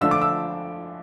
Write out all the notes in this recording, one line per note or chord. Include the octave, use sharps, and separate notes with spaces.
D3 F3 A3 D4 E6
D6
E6